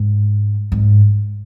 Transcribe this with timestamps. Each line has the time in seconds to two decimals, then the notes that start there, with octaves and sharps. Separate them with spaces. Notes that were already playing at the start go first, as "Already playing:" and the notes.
Already playing: G#2
0.72 G#2